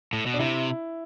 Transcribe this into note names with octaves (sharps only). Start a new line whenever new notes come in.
A2
B2
D4
C3 E4